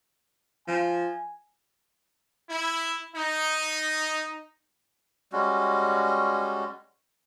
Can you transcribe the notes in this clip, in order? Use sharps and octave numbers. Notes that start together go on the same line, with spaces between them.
F3 G#5
E4
D#4
G3 G#3 C#4 F#4